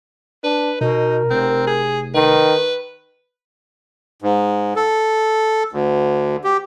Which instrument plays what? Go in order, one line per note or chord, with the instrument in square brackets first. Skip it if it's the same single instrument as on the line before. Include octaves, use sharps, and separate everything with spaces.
[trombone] D4 [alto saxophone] B4
[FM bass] B2 [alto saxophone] D#4 [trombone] A#4
[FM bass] F1 [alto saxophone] C4
[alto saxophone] G#4
[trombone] D#3 [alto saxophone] B4
[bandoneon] G#2
A4
D2
G4